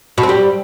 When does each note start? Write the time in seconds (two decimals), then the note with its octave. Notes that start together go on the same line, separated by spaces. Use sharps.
0.18 B2
0.23 C4
0.29 G3